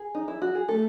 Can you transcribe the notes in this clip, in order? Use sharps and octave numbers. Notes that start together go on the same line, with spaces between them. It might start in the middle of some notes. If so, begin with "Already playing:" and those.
Already playing: G#4
D#4
E4
F#4
G#4
A3 A4